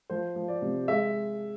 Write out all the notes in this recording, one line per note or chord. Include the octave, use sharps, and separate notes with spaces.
F3 C5
F3
D5
C3
G#3 E5